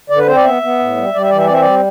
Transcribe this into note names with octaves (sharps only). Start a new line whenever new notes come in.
D3 D5
B4
C4 C5
D5
B3 E5
B3
A2
G3
G3 D5
E5
E3 D5
E5
D5
C4 E5
G3 D5